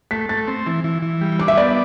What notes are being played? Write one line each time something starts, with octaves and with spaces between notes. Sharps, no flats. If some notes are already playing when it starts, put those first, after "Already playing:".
A3 B6
A3 A6
C4
E3
E3
E3
G3
D4 D6
E5
B3 D5